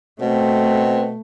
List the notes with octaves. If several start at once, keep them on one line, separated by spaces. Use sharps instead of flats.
B2 A3 C4